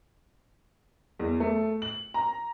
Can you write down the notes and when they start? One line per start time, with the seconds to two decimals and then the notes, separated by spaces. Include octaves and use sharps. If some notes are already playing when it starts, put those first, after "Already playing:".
1.19 E2
1.40 A3
1.82 F#7
2.14 A#5